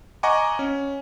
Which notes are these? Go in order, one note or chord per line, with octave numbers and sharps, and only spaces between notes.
D#5 F#5 G#5 A#5 C#6 D6
C#4